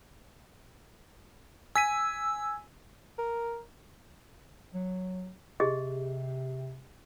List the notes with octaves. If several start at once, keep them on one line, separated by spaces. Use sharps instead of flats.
G#5 E6 B6 D#7
A#4
F#3
C3 G4 G#4 D#5